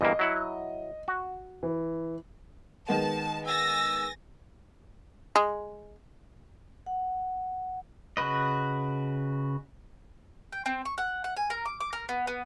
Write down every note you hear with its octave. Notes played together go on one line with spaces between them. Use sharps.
E2 G2 A#3 D#5
F#3 E4 F#5
F#4
E3
D#3 G#3 B3 A5
G#5 E6 A6 A#6
G#3
F#5
C#3 F#4 B4 D#5
G5
C4
C#6
F#5
F#5
G#5
A#4
D6
D6
A#4
B3
B3